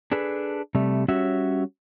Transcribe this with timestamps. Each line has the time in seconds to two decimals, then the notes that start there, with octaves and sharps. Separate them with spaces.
0.12 D4 G#4 A4 B4
0.75 C3 G3 A3
1.08 G3 C#4 F#4 C#5 E5